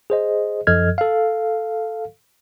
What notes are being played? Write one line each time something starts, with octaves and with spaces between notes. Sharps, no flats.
G#4 C5 D#5
F#2 F3 A4 D#5 F6 G#6
A4 F5